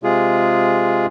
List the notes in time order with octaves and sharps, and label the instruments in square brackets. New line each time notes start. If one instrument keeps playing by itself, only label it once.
[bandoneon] C3 G#3 F4 G#4